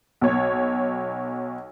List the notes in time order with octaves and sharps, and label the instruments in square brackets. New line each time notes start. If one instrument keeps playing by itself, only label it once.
[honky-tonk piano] B1 C#5